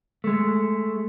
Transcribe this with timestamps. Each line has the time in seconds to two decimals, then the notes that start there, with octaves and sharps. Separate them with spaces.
0.24 G#3 A3